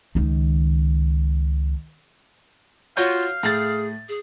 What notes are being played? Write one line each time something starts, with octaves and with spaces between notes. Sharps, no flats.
C#2 D#3
F4 F#4 C#5 F5 G6
A2 G#4 A6
G#4